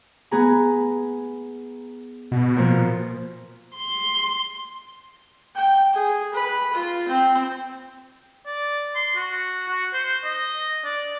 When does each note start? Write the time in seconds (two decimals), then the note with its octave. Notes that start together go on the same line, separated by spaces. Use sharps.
0.31 B3 G#4 A#5
2.32 B2
2.56 A#2 F3
3.76 C6
5.55 G5
5.93 G#4
6.34 B4
6.73 F4
7.08 C4
8.46 D5
8.96 C6
9.16 F#4
9.68 F#4
9.93 C5
10.24 D#5
10.84 D5